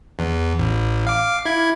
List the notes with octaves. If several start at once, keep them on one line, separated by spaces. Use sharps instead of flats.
E2
A1
F5 D6
E4 G#6